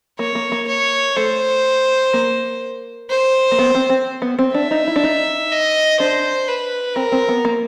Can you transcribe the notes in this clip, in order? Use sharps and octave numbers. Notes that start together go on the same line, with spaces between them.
A#3 C#5
A#3
A#3
C#5
A3 C5
A#3
C5
A#3
B3
C4
C4
B3
C4
D4 E5
D#4
E4
D4
D#4
D#5
D4 C5
B4
C4 A#4
C4
B3
A#3